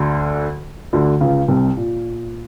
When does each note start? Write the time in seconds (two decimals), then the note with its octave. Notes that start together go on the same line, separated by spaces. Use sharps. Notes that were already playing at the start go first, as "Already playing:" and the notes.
Already playing: D2 D3
0.93 D2 D3
1.20 C#2 C#3
1.48 C2 C3
1.77 A#2